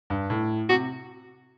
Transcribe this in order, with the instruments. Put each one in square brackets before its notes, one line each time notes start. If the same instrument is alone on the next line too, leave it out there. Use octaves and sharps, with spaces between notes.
[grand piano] G2
A2
[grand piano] C3 [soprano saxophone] F#4